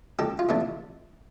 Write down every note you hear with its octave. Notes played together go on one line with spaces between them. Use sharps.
C#2 G4 A4
F4
C3 E3 A3 D4